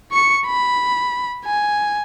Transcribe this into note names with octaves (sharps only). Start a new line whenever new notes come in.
C#6 C#7
B5
G#5